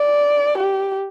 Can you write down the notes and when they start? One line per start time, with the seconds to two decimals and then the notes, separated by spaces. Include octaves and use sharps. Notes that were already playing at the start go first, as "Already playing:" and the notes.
Already playing: D5
0.58 G4